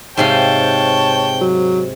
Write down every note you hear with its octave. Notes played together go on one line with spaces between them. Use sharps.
G#2 C3 C#5 F5 G5 A5
F#3